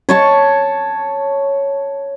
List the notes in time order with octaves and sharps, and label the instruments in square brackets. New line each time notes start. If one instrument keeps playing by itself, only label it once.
[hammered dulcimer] C#5 A5 C#6